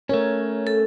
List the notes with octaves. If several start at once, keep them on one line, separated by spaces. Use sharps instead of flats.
A3 C#4 A#4 C#5
A4